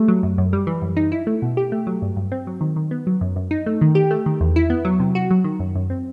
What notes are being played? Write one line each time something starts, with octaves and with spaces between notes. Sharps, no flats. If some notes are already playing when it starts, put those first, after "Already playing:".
Already playing: G3 A3
F#3
F#2
F#2
G3
E3
F#2
D#4
E4
A3
B2
G4
A3
F#3
G2
G2
C4
F#3
D#3
D#3
B3
F#3
F#2
F#2
D#4
A3
D#3
G4
A3
D#3
E2
E4
B3
F#3
C3
F#4
F#3
D#3
F#2
F#2
C4